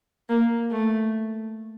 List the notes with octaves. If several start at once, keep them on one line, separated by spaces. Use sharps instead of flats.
A#3
A3